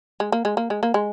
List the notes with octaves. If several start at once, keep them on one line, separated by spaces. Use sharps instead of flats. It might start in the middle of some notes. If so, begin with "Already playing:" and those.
G#3
A#3
G#3
A#3
G#3
A#3
G#3